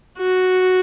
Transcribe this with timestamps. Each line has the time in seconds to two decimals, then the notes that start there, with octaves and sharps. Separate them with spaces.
0.18 F#4